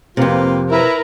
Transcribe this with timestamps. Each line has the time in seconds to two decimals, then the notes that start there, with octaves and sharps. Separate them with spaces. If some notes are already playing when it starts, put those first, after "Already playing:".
0.17 F2 C3 A#3 F4 B4
0.70 E4 A#4 B4 A#5